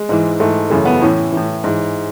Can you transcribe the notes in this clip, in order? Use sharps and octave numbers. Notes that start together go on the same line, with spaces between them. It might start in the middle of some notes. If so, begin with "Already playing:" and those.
Already playing: G#3
G#2 E3
G#2 E3 A3
F#2 C#3 E3 A3
B3
A2 E3 C#4
A2 E3
G#2 E3